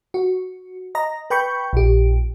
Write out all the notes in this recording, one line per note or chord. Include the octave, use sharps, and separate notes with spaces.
F#4
D#5 A#5
B4 G5 B5 C#6 G6
A#1 G4